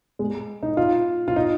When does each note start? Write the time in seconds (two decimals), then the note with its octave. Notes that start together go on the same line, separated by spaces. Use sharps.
0.19 G#3
0.63 D#4
0.77 F4
1.28 F4
1.36 D#4